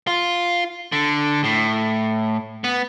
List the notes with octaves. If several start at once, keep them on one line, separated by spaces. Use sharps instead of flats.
F4
D3
A2
B3